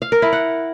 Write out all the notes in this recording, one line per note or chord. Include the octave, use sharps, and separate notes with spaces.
F5
A#4
E4
F#5